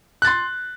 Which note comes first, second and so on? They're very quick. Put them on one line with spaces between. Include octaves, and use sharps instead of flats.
F#6 A6 C6